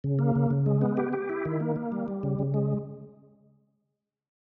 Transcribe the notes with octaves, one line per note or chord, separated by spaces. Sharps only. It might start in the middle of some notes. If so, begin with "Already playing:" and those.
C#3
A#3
C#3
C#3
G#3
B3
G4
G4
E4
D#3
A#3
A#3
G3
G3
C#3
C#3
G#3